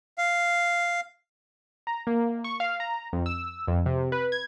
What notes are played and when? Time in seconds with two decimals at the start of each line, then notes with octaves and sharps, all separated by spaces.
0.18 F5
1.87 A#5
2.07 A#3
2.44 C#6
2.60 F5
2.80 A#5
3.13 F2
3.26 E6
3.68 F2
3.86 C3
4.12 B4
4.32 G#6